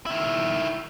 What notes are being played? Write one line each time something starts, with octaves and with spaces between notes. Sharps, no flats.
D#3 E4